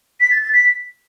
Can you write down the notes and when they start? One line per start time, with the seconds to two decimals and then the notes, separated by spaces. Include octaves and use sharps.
0.20 B6
0.31 A6
0.42 A6
0.53 B6